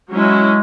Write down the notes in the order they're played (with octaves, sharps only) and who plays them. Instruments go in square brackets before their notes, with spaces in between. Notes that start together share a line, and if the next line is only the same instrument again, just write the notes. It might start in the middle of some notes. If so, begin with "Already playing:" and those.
[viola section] F#3 C#4 E4 [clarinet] G#3